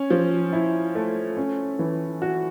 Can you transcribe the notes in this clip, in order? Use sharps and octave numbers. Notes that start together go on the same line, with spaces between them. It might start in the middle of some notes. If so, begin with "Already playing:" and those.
Already playing: C#4
F3
E4
A3
C#4
E3
F#4